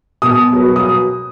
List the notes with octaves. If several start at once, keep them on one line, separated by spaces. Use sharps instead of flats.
B2 D#6
F#3 B3
D#6